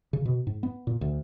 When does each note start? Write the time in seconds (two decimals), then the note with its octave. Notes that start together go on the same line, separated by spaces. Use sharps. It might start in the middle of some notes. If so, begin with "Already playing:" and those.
0.13 C#3
0.25 B2
0.47 G#2
0.63 B3
0.87 A#2
1.01 D2